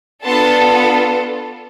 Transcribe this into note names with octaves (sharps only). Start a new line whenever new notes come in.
B3 D4 F4 A4 A5 C6